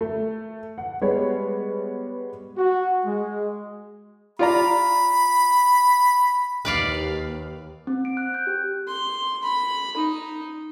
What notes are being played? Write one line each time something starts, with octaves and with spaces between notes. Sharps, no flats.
A3
F#5
G3 G#3 B3 C#5
F#4
G#3
F4 D5 A#5 B5
D#2 B4 D5 F5
C4
D7
F#6
G6
G4
C6
B5
D#4